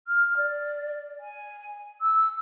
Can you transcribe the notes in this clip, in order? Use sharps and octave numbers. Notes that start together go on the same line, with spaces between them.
F6
D5
G#5
E6